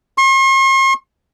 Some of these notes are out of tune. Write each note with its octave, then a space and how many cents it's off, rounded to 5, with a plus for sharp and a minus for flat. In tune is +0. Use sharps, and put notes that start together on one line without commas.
C6 +45